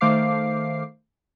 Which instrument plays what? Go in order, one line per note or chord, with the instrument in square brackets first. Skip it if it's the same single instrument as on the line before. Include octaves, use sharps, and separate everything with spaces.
[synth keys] D#3 A3 C5 F5 D6 C7